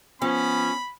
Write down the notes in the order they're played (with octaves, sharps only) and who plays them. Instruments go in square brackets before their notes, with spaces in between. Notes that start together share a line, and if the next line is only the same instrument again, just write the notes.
[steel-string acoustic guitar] F3 [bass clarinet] B3 [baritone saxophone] C#4 [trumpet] B5